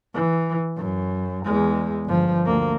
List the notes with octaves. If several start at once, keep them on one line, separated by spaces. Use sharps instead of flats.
E3
F#2
E2 G#3
G1 F3
D2 A#3